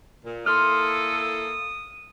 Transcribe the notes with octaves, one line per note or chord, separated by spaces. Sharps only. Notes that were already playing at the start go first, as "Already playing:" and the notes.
A#2
A#3 E4 A4 C6 D#6 F6